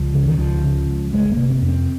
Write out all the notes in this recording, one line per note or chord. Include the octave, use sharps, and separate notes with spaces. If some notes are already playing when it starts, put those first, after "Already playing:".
Already playing: C#2 F3
C#3
D#3
C#2 F3
C#3
C#2
G1 G#3
A#3
C3
C4
F2
C4